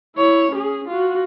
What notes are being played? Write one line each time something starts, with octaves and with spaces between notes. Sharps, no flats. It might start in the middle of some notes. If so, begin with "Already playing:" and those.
E4 C#5
C#4 G#4
F4 F#4